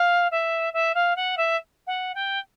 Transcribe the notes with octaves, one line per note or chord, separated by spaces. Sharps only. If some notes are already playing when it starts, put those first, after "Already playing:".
Already playing: F5
E5
E5
F5
F#5
E5
F#5
G5